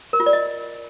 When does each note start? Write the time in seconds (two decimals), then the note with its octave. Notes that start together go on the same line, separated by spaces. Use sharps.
0.13 A#4
0.20 F4
0.26 D5
0.33 D#5